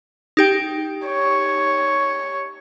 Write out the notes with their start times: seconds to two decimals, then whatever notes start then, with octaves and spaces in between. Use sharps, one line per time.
0.37 D#4 G4 G5
1.07 C#5